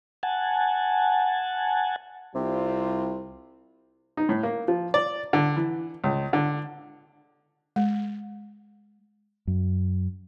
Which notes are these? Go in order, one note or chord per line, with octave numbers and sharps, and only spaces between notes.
F#5 G#5 A5
C2 C3 G3 C4 F4
D#4
A2
A#3
F3
D5
D3
E3
C#2
D3
G#3
F#2